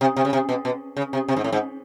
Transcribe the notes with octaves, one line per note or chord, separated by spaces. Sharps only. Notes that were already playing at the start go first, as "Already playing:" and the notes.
C3
C3
C#3
C3
B2
B2
C#3
C3
C3
G#2
A2
G#2